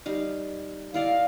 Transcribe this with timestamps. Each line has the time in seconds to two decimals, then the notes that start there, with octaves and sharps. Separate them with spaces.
0.06 G3 D#4 F5
0.94 E4 D5 D#5 F5